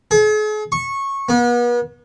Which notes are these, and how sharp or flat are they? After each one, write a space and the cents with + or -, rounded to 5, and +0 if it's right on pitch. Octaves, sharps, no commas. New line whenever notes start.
G#4 +45
C#6 -15
B3 -40